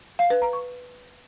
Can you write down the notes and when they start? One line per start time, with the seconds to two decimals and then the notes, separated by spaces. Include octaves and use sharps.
0.19 F5
0.30 B4
0.42 A#5
0.53 C#6